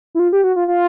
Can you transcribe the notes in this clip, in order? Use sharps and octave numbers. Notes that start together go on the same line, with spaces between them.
E4
F4
G4
F#4
F4
F4